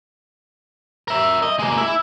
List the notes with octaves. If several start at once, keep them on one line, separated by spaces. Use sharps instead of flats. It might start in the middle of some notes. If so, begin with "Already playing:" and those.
A#4 E5
D#5
G#3 A#3
E4